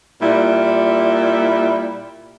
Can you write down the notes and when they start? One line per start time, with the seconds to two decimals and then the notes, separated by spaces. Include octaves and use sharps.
0.22 A#2 G3 E4